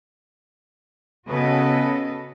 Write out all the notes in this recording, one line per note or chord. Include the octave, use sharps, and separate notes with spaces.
C#3 B3 F#4 A4 B4 D#5